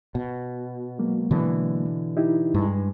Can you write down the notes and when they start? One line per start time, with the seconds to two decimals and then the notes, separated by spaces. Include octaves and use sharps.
0.15 B2
0.99 F#3 G#3 A#3
1.31 B2 D3 E3
2.17 D#4 E4 G4
2.55 G2 G#3